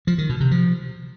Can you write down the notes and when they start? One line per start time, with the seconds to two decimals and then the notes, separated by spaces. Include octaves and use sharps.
0.07 F3
0.18 D#3
0.29 B2
0.40 C3
0.51 F3